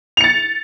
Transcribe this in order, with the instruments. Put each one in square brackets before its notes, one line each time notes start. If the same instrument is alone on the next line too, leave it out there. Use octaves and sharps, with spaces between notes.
[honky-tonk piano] F7
C#7
A6